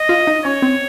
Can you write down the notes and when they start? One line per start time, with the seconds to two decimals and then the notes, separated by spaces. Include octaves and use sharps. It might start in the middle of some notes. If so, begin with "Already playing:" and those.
Already playing: D#5
0.09 F4
0.27 D#4
0.44 C#4 C#5
0.62 C4